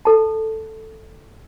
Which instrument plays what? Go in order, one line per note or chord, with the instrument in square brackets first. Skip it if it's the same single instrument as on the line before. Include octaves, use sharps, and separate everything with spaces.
[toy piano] A4 A5